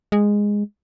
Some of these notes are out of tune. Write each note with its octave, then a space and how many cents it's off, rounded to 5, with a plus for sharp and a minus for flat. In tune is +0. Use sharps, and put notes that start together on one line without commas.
G#3 -10